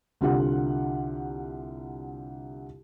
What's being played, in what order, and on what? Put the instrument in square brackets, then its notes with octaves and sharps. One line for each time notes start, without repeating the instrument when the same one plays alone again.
[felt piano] C2 D3 F4 G4 F#5